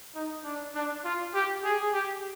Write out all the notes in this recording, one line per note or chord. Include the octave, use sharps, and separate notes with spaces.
D#4
D4
D4
F4
G4
G#4
G4